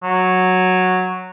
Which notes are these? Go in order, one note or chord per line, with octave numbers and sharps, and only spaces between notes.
F#3